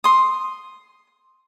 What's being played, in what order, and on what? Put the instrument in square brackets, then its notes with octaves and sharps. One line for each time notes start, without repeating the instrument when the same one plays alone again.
[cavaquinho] C6 D#6